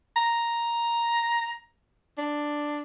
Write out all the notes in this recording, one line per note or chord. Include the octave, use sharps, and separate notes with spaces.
A#5
D4